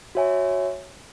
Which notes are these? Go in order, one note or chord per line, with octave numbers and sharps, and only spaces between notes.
F#4 C#5 E5 G#5